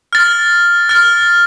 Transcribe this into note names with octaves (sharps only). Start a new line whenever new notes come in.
F6 A6
F6 A6